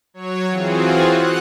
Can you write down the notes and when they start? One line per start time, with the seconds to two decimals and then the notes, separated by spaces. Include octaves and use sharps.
0.14 F#3 C#5
0.50 E3 C4 F4 F#4 G#4
1.08 F#5 F#6